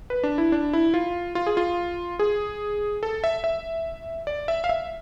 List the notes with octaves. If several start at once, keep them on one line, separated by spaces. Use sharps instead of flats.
B4
D4
E4
D4
E4
F4
F4
G#4
F4
G#4
A4
E5
E5
D5
E5
F5
E5